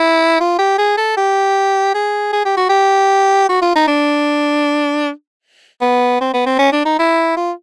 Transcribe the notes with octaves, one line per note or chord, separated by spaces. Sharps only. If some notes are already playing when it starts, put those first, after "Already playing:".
Already playing: E4
F4
G4
G#4
A4
G4
G#4
G#4
G4
F#4
G4
F#4
F4
D#4
D4
B3
C4
B3
C4
C#4
D4
D#4
E4
F4